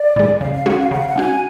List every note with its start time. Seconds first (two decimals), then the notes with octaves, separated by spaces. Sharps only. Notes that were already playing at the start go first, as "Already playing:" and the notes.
Already playing: D5
0.16 A2 G#3
0.41 C#3 F5
0.54 F5
0.65 G#3 C#4 F#4 F#5
0.79 F5
0.91 C#3 F#5
0.99 F5
1.08 F#5
1.16 G#3 C#4 F#4 G#5